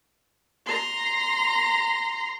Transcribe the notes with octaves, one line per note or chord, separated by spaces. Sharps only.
A#5 C6